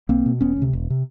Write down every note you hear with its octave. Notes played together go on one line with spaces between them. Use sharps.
B1 A#3 C4
B2
E1 B3 C#4
D2
C3
E1
C3